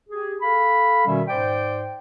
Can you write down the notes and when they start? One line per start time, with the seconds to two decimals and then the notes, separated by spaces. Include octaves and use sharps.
0.09 G4 G#4
0.42 A4 F5 B5
1.07 B2 D#3 G3 C#4 E5
1.28 G#2 C5 D5 G5